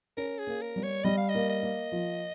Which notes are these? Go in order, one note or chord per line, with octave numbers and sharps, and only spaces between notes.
C#4 A#4
G#4
A#3
A#4
G3
C#5
G3 D#5
F5
D#5
A#3
D#5
A#3
F3